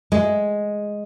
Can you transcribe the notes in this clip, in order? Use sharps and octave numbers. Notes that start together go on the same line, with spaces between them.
G#3